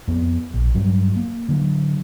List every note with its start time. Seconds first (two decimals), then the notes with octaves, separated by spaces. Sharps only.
0.08 F2 B3
0.54 A#1
0.75 G2 F#3
1.16 A#3
1.48 D3 F#3